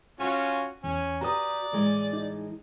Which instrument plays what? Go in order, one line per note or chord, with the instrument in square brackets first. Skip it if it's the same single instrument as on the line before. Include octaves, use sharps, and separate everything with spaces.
[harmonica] C#4 F4 F#4 [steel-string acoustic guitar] G#5
[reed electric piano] E2 [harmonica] C#4
[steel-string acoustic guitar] F#4 G4 B4 [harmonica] D5 [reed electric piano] A#5 D#6
[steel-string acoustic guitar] A2 E3 G#3
[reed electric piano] D#4